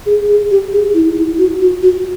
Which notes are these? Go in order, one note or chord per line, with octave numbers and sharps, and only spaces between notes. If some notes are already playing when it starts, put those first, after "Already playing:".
G#4
G#4
G4
G#4
E4
E4
F#4
F#4
F#4